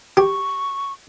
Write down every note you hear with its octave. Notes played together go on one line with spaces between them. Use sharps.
G4 C#6